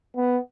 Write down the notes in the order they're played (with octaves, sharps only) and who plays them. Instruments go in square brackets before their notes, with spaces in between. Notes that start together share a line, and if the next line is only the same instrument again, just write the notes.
[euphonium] B3